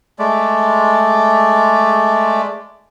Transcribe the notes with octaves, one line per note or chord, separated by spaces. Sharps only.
G#3 A3 D5